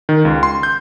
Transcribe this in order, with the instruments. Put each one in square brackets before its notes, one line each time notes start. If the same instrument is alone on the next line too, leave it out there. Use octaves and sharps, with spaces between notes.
[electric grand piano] D#3
C#2
C6
G6